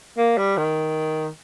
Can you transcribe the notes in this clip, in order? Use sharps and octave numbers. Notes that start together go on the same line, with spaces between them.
A#3
G3
D#3